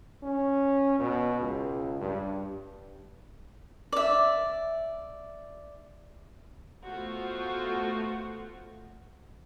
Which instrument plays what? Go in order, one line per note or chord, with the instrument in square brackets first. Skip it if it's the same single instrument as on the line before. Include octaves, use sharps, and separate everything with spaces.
[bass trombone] C#4
B2
C#2
G2
[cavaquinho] D5 E5
[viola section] A3 B3 F4 F#4 C5